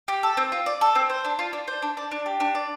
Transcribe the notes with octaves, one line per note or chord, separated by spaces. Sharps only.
G4
A4
C4
F4
D5
A4
C4
C5
D4
F4
D4
C5
D4
D5
D4
G4
D4
D5